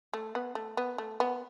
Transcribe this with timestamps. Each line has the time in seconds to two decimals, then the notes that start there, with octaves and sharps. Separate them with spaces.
0.13 A3
0.35 B3
0.55 A3
0.77 B3
0.98 A3
1.20 B3